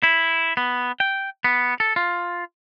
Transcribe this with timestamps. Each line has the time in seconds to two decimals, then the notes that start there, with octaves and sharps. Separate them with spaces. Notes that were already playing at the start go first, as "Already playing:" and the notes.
0.03 E4
0.57 B3
1.00 G5
1.44 B3
1.80 A4
1.96 F4